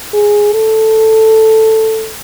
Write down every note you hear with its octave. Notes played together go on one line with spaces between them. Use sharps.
G#4
A4